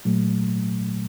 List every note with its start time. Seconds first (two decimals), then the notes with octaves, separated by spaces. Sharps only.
0.05 A#2 F#3 A3